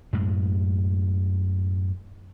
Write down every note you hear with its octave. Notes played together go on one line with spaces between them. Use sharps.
F#2 A2 G#3